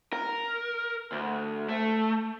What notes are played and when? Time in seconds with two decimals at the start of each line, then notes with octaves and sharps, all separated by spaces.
0.13 A#4
1.12 D2
1.69 A3